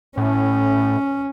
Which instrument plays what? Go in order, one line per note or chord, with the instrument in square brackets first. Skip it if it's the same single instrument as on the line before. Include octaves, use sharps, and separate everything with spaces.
[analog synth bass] A2 [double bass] C#4